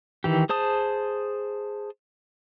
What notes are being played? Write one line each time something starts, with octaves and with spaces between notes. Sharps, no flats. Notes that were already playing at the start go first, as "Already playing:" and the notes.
D#3 E3 G4
G#4 C5 A5 D#6